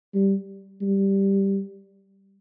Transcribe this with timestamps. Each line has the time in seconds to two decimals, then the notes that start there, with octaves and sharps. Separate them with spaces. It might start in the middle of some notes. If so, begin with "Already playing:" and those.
0.15 G3
0.82 G3